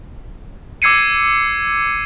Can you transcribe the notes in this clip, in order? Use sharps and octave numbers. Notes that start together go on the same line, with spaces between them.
D6 E6 G#6 C7 C#7 D#7